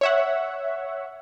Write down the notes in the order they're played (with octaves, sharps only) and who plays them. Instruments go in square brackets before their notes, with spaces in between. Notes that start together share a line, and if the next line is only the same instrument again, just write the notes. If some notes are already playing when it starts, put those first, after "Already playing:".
[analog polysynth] C#5 E5 F#5